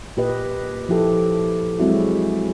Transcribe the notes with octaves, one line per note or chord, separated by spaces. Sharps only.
A#2 G4 B4 D#5
F3 E4 G4 A4
F#3 G#3 C4 E4 F#4